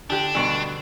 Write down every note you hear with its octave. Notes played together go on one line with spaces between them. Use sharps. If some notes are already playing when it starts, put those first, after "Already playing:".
D2 D4 G4
D2 G2 B2